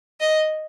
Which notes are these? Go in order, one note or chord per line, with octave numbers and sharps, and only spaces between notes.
D#5